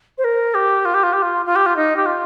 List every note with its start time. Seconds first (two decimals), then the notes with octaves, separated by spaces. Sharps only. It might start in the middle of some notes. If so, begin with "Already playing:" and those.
0.18 C5
0.24 A#4
0.54 G4
0.85 F4
0.94 G4
1.03 F4
1.13 G4
1.22 F4
1.46 F4
1.56 G4
1.66 F4
1.76 D#4
1.96 G4
2.06 F4